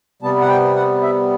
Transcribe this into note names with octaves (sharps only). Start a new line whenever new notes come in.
C3 G3 B3 A5
F#5
G5
F#5
E5